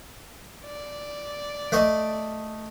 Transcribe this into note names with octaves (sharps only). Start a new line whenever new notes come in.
D5
A3 D#5